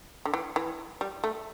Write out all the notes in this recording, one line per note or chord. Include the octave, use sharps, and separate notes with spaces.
D3
E3
E3
G3
A3